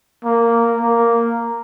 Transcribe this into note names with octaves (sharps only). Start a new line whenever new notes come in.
A#3
A#3